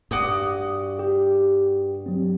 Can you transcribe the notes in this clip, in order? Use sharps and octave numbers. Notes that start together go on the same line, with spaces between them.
G2 F#4 D6 D#6
G4
F#3 C4